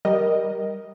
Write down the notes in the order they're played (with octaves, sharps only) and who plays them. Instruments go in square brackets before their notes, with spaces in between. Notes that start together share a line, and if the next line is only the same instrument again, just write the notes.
[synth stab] G3 A#4 D#5